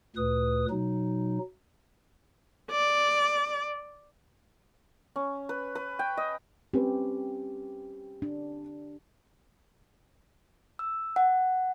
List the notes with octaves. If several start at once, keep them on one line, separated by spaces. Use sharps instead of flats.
D2 A#2 B4 D#6
B2 F#3 D#4
D5
C#4
B4
B4
G5
D#5
C4 C#4 G4 B4
D4
E6
F#5